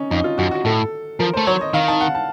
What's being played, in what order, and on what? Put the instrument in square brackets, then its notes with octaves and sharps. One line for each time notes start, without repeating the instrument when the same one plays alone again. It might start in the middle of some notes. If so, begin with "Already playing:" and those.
Already playing: [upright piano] C#4 D#4
[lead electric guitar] F2 [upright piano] D#4
[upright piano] F4
[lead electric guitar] F#2 [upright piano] F#4
[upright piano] F#4
[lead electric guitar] A2 [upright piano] A4
[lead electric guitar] F3 [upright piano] A#4
[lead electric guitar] A3 [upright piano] C5
[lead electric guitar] F#3 [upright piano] C#5
[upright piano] D#5
[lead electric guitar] D#3 [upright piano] F5
[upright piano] A5
F#5
A5